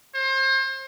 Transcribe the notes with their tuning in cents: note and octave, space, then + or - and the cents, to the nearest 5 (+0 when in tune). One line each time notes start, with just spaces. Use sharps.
C5 +30